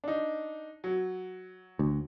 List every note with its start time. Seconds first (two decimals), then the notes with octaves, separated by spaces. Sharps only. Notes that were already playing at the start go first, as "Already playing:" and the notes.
0.04 D4 D#4
0.84 F#3
1.79 D2